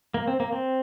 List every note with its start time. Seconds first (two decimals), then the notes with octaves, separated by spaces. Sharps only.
0.14 A#3
0.28 C4
0.40 A#3
0.52 C4